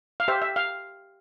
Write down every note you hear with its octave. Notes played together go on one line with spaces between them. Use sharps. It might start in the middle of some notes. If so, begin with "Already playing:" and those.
F5
G4 C5 E5
E5
F5